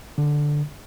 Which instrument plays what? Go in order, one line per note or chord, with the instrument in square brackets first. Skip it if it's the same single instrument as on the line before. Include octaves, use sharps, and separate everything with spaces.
[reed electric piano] D3